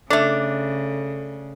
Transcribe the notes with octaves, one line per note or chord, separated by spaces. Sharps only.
C#3 A3 D4 A4